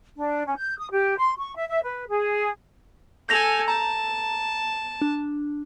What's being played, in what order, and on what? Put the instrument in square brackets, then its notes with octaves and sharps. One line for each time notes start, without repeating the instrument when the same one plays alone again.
[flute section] D4
C#4
G6
D#6
G4
C6
C#6
E5
E5
B4
G#4
[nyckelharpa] A4 G#5 [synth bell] G6 A#6 F7
[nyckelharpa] A5 [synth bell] A#5
[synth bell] D4